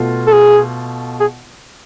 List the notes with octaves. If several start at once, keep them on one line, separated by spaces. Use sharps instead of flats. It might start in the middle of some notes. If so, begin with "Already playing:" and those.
Already playing: B2 A3 F4
A4
G#4
G#4